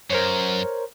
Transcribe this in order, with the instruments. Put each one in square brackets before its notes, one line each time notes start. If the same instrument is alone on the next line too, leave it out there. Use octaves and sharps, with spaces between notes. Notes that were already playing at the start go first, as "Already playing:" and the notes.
[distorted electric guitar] F#2 [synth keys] A#4 C5 C#5